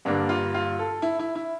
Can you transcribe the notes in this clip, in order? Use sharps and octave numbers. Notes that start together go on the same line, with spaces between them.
G2 D3 G3 A#3 D4
F4
F4
A4
E4
E4
E4